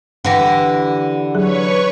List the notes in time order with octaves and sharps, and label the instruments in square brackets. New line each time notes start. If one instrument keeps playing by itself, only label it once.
[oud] D3 E3 G4 [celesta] F#5 A#6
[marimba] F#3 G#4 [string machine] B4 C#5 C#6